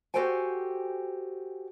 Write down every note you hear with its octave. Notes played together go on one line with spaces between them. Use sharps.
F#4 G4 A4 C5 G5 G#5